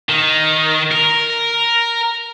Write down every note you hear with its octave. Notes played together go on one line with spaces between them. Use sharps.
D#3
A#4